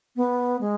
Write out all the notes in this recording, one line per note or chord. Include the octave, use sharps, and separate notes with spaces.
B3
G#3